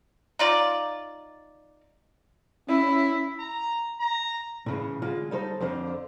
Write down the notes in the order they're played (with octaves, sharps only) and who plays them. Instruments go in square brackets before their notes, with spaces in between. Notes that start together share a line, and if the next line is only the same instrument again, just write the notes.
[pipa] D#4 F4 D5
[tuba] C#4 [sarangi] E4
[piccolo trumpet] A#5
A#5
[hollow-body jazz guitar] A2 C#3 E3
D3 G#3 F4 F5
G3 D#4 A4 C5
F2 D3 C5 F5